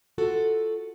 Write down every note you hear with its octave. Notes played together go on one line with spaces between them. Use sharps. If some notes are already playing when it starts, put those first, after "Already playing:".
F4 F#4 A4